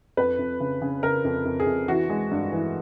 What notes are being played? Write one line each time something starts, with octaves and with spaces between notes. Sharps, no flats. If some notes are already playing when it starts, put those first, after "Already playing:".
F2 B4
F2
C#3
C#3
C#3 A#4
F2
F2
G#4
F2
E3 F#4
G#3
G2
E3